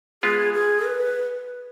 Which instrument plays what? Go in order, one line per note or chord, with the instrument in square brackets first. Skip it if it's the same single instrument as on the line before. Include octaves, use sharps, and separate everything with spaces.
[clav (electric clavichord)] G#3 B3 F4 [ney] G#4
[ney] G#4
B4